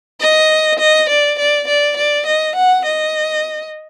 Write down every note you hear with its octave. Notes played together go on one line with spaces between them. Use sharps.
D#5
D#5
D5
D5
D5
D5
D#5
F#5
D#5